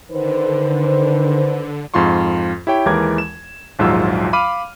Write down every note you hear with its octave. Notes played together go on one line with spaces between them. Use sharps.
D3 D#3 B4 C5
F2 G#2 F4 C6 C#6
E4 G4 C#5 G5
D#2 E3 G#3 A#4 D6 G#6
E7
A#1 D#2 G#2 F#3 F4 E6
F5 B5 D6 F6 D#7